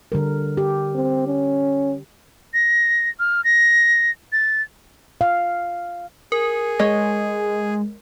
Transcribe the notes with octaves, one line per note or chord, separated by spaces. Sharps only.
D3 G3 A#4
G4
C4
C#4
A#6
F6
A#6
A6
F5
G#4 A#4
G#3 C#5 D#5